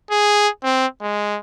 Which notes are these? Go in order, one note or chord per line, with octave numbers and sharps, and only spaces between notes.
G#4
C4
G#3